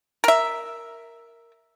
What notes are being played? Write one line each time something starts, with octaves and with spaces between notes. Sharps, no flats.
A#4 E5